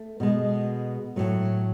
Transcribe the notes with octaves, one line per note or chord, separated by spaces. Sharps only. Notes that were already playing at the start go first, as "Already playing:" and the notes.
Already playing: A3
B2 G#3
A2 F#3 A3